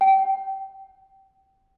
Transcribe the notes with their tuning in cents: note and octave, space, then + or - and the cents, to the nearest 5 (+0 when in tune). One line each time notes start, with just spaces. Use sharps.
G5 -20